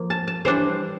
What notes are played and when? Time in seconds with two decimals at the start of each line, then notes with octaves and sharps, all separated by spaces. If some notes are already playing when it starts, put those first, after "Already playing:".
Already playing: F3 A#3
0.10 A5
0.28 A5
0.45 E3 G3 D4 C5